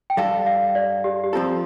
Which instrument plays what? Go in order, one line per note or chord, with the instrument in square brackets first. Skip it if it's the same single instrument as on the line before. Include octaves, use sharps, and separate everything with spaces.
[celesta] G5
[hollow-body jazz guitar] G2 G3 D4 A4 [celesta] F5
[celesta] F5
D5
G4
G4
[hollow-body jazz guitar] F3 C4 A4 [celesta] F4